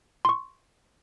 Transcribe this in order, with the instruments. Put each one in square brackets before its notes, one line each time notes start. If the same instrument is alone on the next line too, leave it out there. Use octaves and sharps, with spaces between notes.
[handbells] C6 C#6